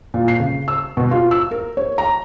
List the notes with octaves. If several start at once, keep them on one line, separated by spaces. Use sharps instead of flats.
A#2
C7
C#3
E6
B2
F4
E6
A#4
C#5
A#5